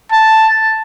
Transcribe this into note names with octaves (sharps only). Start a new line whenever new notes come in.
A5